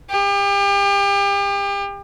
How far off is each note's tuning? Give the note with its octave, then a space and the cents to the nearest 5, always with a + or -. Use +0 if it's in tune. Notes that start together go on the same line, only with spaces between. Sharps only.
G4 +35